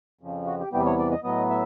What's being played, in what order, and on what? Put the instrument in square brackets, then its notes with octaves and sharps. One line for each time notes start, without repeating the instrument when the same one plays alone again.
[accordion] F2 C#3 F3
F#4
G4
E2 C3 E3 G3 B3 G4
C#5
D5
D#5
A2 F#3 B3 D#5
E5